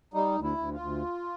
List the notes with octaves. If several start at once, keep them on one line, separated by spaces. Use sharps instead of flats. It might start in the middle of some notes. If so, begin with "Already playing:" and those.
G3 D#4
D2
E4
D2
F4
D2